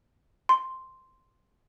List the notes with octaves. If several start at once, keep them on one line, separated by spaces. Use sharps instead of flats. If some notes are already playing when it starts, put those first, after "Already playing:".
C6